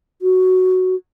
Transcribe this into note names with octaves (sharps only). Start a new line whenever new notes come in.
F#4